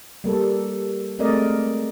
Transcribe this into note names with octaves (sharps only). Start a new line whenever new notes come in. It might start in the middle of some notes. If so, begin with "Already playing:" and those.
G3 A#3 A4
G#3 A3 C4 A#4 D5 D#5